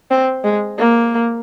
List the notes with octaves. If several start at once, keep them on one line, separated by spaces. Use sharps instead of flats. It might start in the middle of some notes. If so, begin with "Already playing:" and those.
C4
G#3
A#3